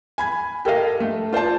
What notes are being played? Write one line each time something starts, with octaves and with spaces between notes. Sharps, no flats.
G#5 B5 G#6
G4 A4 A#4 D#5 F5
A3
F4 C5 D5 A5